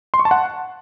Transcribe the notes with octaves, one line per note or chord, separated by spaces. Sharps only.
C6
C#6
A5
F#5